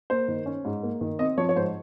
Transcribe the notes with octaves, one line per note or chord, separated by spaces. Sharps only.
A#3 C5
D#3
C#4
G#2
A#3
D#3
C4 D#5
F3 C#5
C#5
G#2 C5